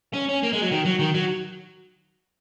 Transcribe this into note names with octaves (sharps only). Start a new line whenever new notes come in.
C#4
C#4
A#3
G#3
F#3
D#3
F#3
D#3
F#3